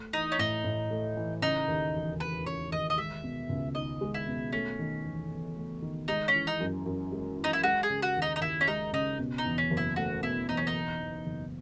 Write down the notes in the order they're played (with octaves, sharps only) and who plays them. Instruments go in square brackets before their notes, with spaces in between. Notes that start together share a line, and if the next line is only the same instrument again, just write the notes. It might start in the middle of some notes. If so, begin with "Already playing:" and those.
Already playing: [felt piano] A3
[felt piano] E3 [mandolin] D#4
[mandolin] C#4
[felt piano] A2 [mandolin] D#4
[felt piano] A2
A3
E3
[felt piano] C#3 [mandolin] D#4
[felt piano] D#2
E1
[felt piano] E1 [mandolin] B4
[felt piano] C#3 [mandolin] C#5
[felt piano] D#2 [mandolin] D#5
[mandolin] D#5
[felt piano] G#3 [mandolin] E5
[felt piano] B2
C#2
[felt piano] D#4 [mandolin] D#5
[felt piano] G#3
[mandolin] E4
[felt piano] B2
[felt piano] A3 [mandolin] C#4
[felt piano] D#3
E2
E2
A3
D#3
[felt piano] G#3 [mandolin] D#4
[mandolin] C#4
[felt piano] E3
[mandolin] D#4
[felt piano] F#2
F#2
G#3
E3
[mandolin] D#4
E4
[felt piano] G#3 [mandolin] F#4
[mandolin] G#4
[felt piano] C#3
[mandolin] F#4
[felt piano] D#2
[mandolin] D#4
D#4
[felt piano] D#2 [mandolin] E4
[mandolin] C#4
[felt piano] G#3 [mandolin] D#4
[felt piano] C#3 [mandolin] D#4
[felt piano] B2
[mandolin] D#4
[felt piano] E2
[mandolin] C#4
[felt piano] F#1
[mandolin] E4
[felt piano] A3 [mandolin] F#4
[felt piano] B2 [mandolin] E4
[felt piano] E2 [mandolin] D#4
[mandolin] C#4
D#4
[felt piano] B2
E2
F#1